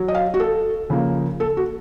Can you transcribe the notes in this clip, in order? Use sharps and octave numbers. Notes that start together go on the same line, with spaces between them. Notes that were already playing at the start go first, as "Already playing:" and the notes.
Already playing: F#3
D#5
F5
F#4
A4
C#3 F3 A#3
A4
F#4